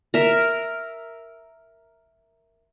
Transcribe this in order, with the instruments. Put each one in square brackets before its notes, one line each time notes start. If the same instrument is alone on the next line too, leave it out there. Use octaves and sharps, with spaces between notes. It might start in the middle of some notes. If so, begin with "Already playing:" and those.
[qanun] A#4 E5